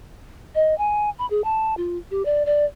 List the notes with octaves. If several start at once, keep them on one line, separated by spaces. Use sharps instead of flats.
D#5
G#5
B5
G#4
A5
F4
G4
D5
D5